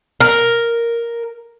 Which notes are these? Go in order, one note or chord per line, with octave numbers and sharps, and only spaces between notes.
A#4